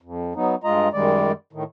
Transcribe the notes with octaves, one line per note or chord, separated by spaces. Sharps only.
F2
F#3 B3 D#4
G2 G#3 F4 D#5 A#5
F#2 D#3 G3 G#3 D5
A2 D#3